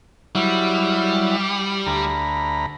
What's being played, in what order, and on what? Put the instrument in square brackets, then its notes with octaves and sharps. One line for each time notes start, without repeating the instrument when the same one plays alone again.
[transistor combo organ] F#3 E4 [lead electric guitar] G3
[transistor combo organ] D2 A#5 B5